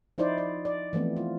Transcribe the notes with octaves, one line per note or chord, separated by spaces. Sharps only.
F3 D#4 E4 C5 D5
D5
D5
E3 F3 A3 B3 C4
F4